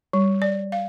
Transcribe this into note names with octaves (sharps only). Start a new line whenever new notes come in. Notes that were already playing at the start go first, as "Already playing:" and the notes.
G3
D5
F5